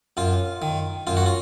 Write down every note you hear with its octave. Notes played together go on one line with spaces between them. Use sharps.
F#2 F4
D#3
F#2 F4
F#4
F4